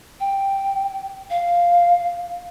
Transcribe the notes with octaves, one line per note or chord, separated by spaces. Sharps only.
G5
F5